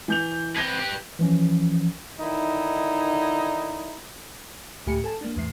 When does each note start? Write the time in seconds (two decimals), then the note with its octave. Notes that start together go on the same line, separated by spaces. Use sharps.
0.08 E3 G6 F7
0.56 C4 B4 G#6 A#6 G7
0.79 G4 B4
1.19 E3 F3 C#4
2.20 D3 D#3 D#4 E4
4.86 D2 A2 G4 G#5 B5 C#7
5.04 A4 G#5 A5
5.21 A#3 D4
5.36 E2 A2 C7